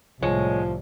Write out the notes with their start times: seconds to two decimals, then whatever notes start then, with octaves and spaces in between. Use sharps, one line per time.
0.23 C2 A2 F3 G#3 C#5